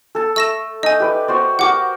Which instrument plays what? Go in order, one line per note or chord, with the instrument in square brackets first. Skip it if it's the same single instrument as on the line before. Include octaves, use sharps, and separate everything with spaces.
[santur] A4 A5
[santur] A3 [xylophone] E6 A#6 E7
[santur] D#4 [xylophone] D#5 G#5
[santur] G4 B4 D5
F#4 C5 D5
[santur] F#4 G4 A#4 [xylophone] F#5 D6